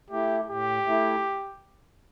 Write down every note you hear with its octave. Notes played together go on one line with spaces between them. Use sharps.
A3 E4 G4
A2 G4
A3 E4